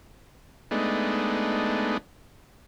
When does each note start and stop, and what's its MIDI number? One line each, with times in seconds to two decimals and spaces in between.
0.71 1.97 56
0.71 1.97 57
0.71 1.97 59
0.71 1.97 62
0.71 1.97 63